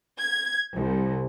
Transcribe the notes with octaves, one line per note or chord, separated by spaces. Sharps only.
G#6
C2